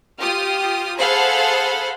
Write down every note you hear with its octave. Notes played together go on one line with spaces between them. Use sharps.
F4 G4 D#6 F6
G#4 A4 C5 F5 F#5 B5